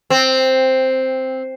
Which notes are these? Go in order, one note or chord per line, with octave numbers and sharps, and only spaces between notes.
C4